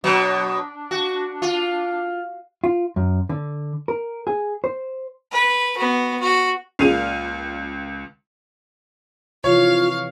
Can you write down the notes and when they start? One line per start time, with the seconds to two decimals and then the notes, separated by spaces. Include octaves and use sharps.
0.04 B2 F#3 D4
0.91 F#4
1.42 F4
2.64 F4
2.96 F#2
3.29 D3
3.88 A#4
4.27 G#4
4.64 C5
5.32 B4
5.77 B3 F#4
6.20 F#4
6.79 C#2 A#2 C#4 G#4 F5 D#7 F7
9.44 C3 E3 F3 F4 C#5 F5